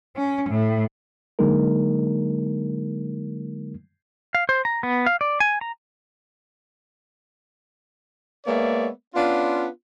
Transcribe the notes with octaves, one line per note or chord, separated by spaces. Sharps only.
C#4
A2
D3 F#3 G#3 A#3 D#4 A#4
F5
C5
A#5
B3
F5
D5
G#5
A#5
G#3 A#3 B3 C#5 D5 E5
B3 C#4 D4 F4